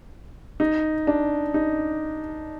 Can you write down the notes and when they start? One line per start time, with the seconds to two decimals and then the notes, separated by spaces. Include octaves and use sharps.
0.60 D#4
1.07 D4
1.54 D#4